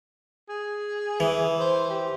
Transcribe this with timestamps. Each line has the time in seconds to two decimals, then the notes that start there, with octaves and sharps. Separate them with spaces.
0.49 G#4
1.20 E3
1.60 C5
1.90 G4